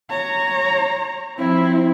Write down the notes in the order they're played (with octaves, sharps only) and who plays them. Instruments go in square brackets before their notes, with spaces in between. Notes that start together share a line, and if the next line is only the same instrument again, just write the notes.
[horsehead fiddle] C#5 A#5
[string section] F3 C4 [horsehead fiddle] E4